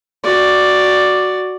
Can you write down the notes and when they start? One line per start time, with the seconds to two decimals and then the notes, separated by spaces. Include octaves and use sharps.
0.23 F#4 D5